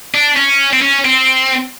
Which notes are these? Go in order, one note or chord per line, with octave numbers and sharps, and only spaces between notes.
D4
C#4
C4
C#4
C4